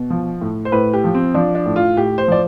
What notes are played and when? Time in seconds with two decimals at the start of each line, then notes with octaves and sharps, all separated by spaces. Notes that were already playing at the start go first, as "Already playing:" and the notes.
Already playing: B2
0.10 F3
0.41 A2
0.65 C5
0.72 A2 B4
0.93 G4
1.04 F3
1.15 C4
1.34 F3 D4
1.55 D4
1.66 A2
1.76 F4
1.97 A2 G4
2.18 C5
2.28 F3 D5